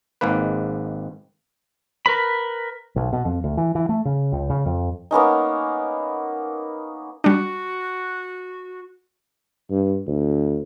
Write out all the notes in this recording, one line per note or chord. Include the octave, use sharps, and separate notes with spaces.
G#1 G#2 G#3 A#3 B4
A#4 B4 B5
B1
B2
F2
D2
E3
E3
A3
C#3
C#2
C#3
F2
A#3 B3 C#4 D#4
G3 D4 F#4
G2
D2